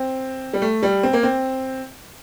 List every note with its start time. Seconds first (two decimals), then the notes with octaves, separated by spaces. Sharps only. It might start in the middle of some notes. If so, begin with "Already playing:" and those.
Already playing: C4
0.53 G3
0.62 A3
0.83 G3
1.03 C4
1.13 A#3
1.23 C4